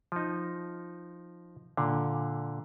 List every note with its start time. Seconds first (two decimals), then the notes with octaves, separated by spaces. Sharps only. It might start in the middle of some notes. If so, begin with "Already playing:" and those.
0.12 F3 D#4
1.77 A#2 D3